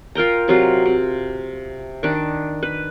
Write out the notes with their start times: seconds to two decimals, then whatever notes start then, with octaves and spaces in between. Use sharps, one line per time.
0.15 F4 A#4 G5 A#5
0.48 C3 F#3 F4
0.86 C3
2.03 D#3 D4
2.63 B4